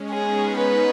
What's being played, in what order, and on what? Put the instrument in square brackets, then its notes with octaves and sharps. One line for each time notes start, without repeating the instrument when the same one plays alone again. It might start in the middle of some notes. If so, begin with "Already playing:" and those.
Already playing: [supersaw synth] G#3 C#4
[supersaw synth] B3 D#4 [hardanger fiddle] G#4
[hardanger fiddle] B4